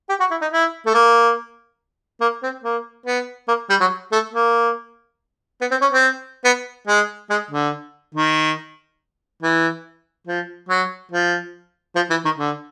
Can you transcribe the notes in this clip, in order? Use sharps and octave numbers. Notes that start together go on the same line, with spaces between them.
G4
F#4
E4
D#4
E4
A3
A#3
A#3
C4
A#3
B3
A#3
G3
F#3
A3
A#3
B3
C4
C#4
C4
B3
G#3
G#3
D3
D#3
E3
F3
F#3
F3
F3
E3
D#3
D3